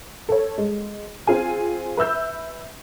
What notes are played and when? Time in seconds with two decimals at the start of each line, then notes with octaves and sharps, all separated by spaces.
0.29 A4 C#5
0.58 G#3
1.27 C4 F4 G#4 G#5
1.97 B4 E5 E6 G6